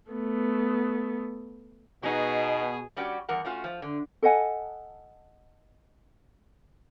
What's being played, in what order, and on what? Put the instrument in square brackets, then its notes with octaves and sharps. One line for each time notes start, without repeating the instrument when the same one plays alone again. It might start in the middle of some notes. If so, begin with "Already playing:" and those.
[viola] A3 B3
[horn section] B2 [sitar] D#4 F#4 [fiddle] G#4
[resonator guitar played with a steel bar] G3 C#4 F#4 G4 D5
E2 G3 A#4 F#5
A3 C#4 F4 F#4
F3
D3
[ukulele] A4 D#5 F#5 G#5